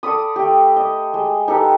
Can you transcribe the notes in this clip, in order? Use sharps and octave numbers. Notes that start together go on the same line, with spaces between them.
A4 D5 B5 D#6
A3 G4
D#5
G#3
D#4 G4 A4 B4